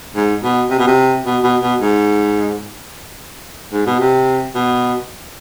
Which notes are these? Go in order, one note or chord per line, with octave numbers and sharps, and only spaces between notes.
G#2
B2
C3
B2
C3
B2
B2
B2
G#2
G#2
B2
C3
B2